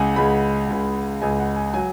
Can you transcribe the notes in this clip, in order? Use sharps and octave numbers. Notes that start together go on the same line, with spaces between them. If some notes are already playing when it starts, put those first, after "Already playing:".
Already playing: C#2 C#3 G#3 F#5 G#5
C#2 C#3 G#3 B5
C#2 C#3 G#3
C#2 C#3 G#3 G#5
F#5
G#5
F#3 G#5